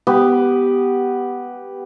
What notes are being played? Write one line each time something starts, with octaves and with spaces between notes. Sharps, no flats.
B3 G4